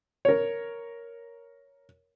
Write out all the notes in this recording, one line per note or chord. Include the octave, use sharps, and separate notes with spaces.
A#4 C#5